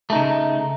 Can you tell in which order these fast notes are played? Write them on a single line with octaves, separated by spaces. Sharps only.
A3 D#4 C#3